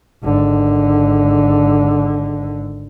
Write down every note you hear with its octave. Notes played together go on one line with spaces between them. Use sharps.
G#1 D3